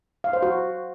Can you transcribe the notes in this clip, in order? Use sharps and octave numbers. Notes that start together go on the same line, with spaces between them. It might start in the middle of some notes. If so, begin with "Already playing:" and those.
F5
C5
F#4